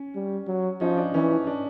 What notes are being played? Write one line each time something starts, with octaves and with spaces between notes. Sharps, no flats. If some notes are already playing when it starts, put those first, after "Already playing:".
Already playing: C#4
G3
F#3
F3 C#4 D#4
D4
E3 C#4
D4
D4